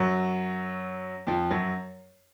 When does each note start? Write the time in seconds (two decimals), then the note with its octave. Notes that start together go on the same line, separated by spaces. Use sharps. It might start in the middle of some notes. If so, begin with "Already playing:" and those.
Already playing: F#2 F#3
1.27 F2 F3
1.51 F#2 F#3